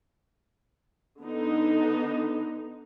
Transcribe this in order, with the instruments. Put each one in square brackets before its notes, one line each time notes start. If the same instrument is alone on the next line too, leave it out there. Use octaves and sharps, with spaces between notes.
[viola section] D3 B3 D#4